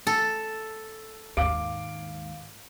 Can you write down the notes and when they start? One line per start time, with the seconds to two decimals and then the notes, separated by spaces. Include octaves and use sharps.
0.07 A4
1.37 D#2 G#2 F5 D6 D7